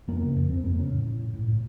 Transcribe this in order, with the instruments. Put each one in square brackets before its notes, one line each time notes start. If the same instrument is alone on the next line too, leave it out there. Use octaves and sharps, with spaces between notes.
[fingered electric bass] F2 A#3
C#3
F2
F2 C4
F2 A#3
C#3 C#4
A2
A2
A2
A2
A2